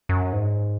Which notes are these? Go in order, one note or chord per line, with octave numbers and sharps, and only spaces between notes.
F#2
G#2